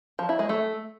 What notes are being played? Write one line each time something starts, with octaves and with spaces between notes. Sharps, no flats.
F3
E4
G#3
A3